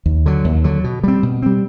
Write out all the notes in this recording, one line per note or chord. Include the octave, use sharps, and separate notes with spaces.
D#2
D3 F#3
D#2
D3 F#3
B2
G3 C4
B2
G3 C4